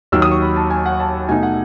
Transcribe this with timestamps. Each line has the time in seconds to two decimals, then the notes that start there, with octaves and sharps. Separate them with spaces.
0.12 D#2 D#3 F#3 E6
0.22 D#6
0.31 C#6
0.42 B5
0.56 A5
0.70 G#5
0.86 F#5
1.00 A5
1.29 B2 A3 D#4 G#5
1.43 F#5